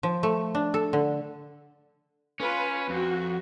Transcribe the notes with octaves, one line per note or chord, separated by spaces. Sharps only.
F3
A3
D4
A4
D3
C#4 F4 B4
F2 F#4